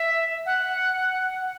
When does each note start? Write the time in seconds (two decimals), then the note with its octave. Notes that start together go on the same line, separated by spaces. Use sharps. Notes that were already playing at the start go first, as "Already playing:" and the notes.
Already playing: E5
0.46 F#5